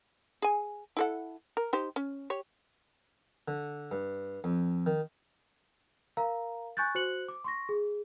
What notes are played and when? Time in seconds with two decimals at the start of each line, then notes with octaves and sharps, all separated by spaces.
0.42 G#4 G#5
0.97 E4 A4 F#5
1.57 A#4
1.73 D#4 G4 C5
1.96 C#4
2.30 G4 C#5
3.48 D3
3.92 G2
4.44 F2
4.86 D#3
6.17 A#4 F5 A#5
6.77 G#5 C#6 F#6 G6 A6
6.95 F#4 C5 F#6 C#7 F#7
7.28 D6
7.44 C6 C#6 A#6
7.69 G#4